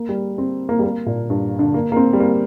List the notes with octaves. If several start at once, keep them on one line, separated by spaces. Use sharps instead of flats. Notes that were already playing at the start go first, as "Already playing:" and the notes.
Already playing: A#3
G3
C4
A#3
G3
A#3
A#2
G2
D3
A#3
A#3
C4
G3
A#3